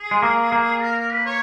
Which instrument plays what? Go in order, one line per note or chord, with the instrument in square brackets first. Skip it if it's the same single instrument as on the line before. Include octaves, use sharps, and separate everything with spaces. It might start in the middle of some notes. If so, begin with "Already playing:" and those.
Already playing: [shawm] G#4
[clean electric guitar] G#3
A#3
A#3
[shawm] A#4
A#4
B4
C#5